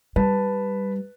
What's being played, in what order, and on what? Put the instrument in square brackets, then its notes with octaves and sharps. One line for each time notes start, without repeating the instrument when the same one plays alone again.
[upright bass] G3 [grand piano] B4 A5